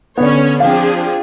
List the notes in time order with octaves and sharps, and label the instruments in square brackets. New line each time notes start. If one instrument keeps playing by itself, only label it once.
[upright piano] D3 B3 [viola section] C#4 C#5
[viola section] F3 D4 G#4 [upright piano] C4 F5